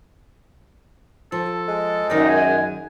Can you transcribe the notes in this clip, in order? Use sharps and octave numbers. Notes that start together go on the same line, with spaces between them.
F3 A4
G#3
F#2 D#3 D#4 D5
G#5